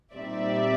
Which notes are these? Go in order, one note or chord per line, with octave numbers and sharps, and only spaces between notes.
A#2 G3 C4 D#4 D5 E5